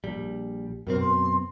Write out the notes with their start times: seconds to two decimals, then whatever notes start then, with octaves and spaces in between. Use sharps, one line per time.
0.04 A#1 G3
0.87 F#2 B2 C4 A#4
0.99 C6